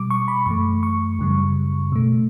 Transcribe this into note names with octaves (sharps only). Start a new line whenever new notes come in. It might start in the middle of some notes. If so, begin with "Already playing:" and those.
Already playing: B2 G3 D6
C#6
B5
F#2 E3 A3 C#6
C#6
F#2 C#3 G3
B2 A3